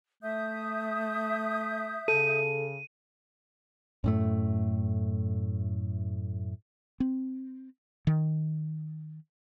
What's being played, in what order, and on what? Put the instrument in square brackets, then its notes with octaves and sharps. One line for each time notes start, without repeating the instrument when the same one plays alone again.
[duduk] A3 [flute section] E5 D#6 G6
[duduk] C#3 [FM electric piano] A4 [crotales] D#7
[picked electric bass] F#2 A2 A3
[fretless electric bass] C4
D#3